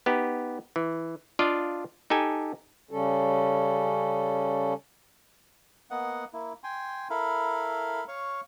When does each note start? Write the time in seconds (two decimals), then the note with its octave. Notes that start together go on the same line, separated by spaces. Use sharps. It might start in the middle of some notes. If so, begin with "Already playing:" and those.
0.06 B3 D#4 G4
0.76 E3
1.39 D4 F4 D5 D#5 F5
2.10 D#4 G4 A4 G#5
2.91 C#3 G3 C#4 A4
5.91 A#3 B3 D#5 F#5
6.33 A#3 E4
6.64 G5 G#5 C6
7.10 E4 A4 A#4 F5 B5
8.08 C#5 F5 C#6